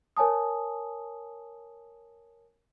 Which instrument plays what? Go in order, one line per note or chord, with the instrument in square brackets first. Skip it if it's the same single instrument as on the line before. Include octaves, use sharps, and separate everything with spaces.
[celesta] A#4 C#5 G#5 A5 D#6